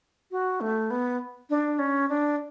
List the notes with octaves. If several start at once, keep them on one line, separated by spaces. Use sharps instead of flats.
F#4
A3
B3
D4
C#4
D4